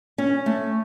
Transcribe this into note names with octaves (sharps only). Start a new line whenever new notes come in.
C#4
A3